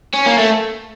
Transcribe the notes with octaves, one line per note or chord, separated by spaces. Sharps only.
C#4
A#3
A3